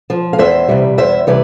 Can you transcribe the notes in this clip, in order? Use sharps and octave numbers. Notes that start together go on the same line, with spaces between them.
F3
F5
E2 C5 E5
C3 E3 G3
E2 C5 E5
C3 E3 G3 B4 D5